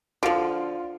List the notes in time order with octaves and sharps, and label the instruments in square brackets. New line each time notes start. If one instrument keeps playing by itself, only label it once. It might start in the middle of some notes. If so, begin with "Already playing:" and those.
[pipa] D3 F3 [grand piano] F4